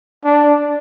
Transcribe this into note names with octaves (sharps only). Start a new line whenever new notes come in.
D4